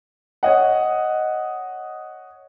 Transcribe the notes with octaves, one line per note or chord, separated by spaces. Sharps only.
C#5 D#5 F#5